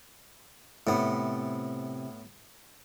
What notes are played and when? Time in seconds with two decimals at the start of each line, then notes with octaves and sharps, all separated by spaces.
0.87 A2 C3 B3 C4 E4